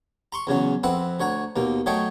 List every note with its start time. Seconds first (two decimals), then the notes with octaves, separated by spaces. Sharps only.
0.32 A#5 C6 C#6
0.47 E2 C#3 F#3 C#4
0.84 F2 C4 B4 E5 F#5
1.20 D2 C#5 F#5 A#5
1.56 D#2 B2 A#3
1.86 F#3 A3 C#5 D#5 G5 C#6